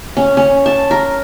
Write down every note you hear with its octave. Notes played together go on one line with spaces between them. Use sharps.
C#4
C#4
A5
A#4